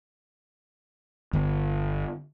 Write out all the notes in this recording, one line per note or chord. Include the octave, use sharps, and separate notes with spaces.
G1